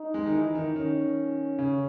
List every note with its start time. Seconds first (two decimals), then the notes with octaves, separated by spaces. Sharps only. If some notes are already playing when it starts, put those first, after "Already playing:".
Already playing: D#4
0.14 G#3
0.26 D#3
0.35 E3
0.55 D#3
0.76 D#3 C#4
1.59 C#3